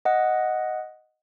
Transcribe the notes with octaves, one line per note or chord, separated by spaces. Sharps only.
D#5 F#5